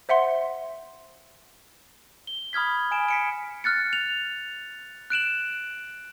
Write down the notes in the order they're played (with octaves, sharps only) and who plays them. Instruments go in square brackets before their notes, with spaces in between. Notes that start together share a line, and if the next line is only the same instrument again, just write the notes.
[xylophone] C5 E5 F#5 C6
[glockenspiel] G7
B5 D#6 F6 G#6 B6
G#5 D7 E7
B6 C#7 D7
F6 F#6 A6 C#7
F7
F#6 D7 E7 F#7